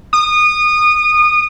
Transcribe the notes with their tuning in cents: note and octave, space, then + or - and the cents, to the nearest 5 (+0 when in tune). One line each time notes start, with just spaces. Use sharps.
D#6 -25